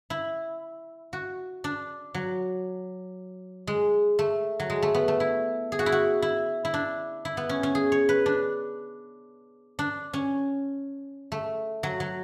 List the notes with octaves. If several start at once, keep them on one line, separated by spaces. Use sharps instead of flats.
E4
F#4
D4
F#3
G#3
A3
F#3
G#3
A3
B3
A3
E4
G#4
F#4
E4
F#4
E4
E4
D4
E4
B3
C#4
C#4
G#4
C#5
B4
D4
D4
C#4
A3
F#3
F#3